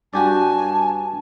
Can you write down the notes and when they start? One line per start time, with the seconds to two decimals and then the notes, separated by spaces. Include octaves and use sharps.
0.13 G2 F#4 G4 D5 G#5 A5